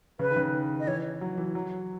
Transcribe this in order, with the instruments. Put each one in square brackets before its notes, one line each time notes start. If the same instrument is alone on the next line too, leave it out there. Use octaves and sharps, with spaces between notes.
[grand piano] C#3 [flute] B4
[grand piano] D#3
C#3
D#3
[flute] D#5
[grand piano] E3 [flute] C#5
[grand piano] F#3
E3
F#3